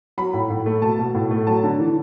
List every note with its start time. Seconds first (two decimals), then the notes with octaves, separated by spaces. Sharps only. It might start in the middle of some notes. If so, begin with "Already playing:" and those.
0.18 F#3 B5
0.33 A2
0.50 A2
0.66 A3
0.82 B2 A5
0.99 B2
1.15 A2
1.31 A3
1.47 F#3 A5
1.63 D3
1.80 E3